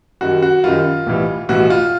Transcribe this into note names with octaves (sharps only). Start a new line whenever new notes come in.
F#2 D#3 G3 F#4
F#4
F#2 D#3 G3 F4
B1 A2 E3 G3
B1 A2 E3 G3 F#4
F4